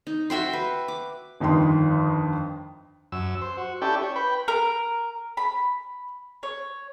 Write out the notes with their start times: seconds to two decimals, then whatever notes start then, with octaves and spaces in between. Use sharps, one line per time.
0.07 D#4
0.30 F#4 E5 G5 C6
0.53 B4
0.88 D6
1.40 G1 F2 D#3 D#4 C6
3.12 F#2 E6
3.42 C5
3.57 F#4
3.82 C#4 E4 G4 A4 D5 G5
4.02 C#5
4.16 B4 G5 B5
4.48 A#4
5.37 B5
6.43 C#5